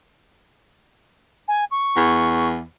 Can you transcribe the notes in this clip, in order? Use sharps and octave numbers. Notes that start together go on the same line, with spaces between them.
G#5
C#6
E2